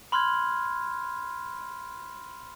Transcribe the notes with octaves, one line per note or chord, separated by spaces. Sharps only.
B5 C6 F6 F#6 G#6